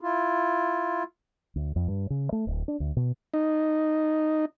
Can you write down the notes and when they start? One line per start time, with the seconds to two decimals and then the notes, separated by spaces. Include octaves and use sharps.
0.01 E4 F4
1.56 D2
1.76 F2
1.88 G2
2.10 C#3
2.32 A3
2.47 D1
2.68 D4
2.80 D2
2.97 B2
3.34 D#4